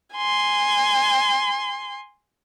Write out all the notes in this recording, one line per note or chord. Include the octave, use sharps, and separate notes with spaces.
G#5 C6